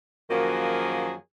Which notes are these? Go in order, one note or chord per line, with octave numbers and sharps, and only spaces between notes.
F#2 D#3 F3 F#3 A#3 G#4